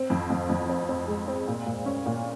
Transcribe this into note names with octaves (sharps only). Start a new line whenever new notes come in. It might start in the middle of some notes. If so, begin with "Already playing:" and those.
Already playing: C4
F2
F2
F2
C4
C4
G#3
C4
A#2
A#2
C#4
A#2